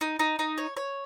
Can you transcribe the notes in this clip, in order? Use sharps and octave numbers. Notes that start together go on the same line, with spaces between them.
D#4
D#4
D#4
C#5
C#5